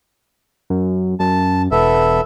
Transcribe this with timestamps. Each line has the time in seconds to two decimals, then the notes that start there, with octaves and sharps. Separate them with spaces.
0.70 F#2
1.20 F#2 A5
1.71 E1 B3 A4 E5